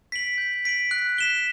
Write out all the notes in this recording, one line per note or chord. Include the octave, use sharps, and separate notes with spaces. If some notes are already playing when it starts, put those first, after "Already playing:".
B6 D7 F#7
G6
B6 D7 F#7
F#6
B6 E7 G7